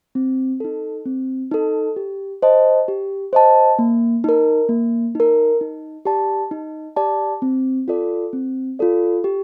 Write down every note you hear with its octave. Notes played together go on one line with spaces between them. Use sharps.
C4
D#4 A4
C4
D#4 A4
G4
C5 D#5 A5
G4
C5 D#5 A5
A#3
D#4 A#4
A#3
D#4 A#4
D#4
G4 D5 A5
D#4
G4 D5 A5
C4
F4 A4 D5
C4
F4 A4 D5
G4